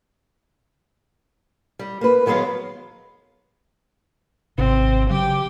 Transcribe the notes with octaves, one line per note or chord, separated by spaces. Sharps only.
G3
A#3 B4
D#3 F#3 G#3 B3 F5
G#1 C3 C4
C#3 F#3 G4 G5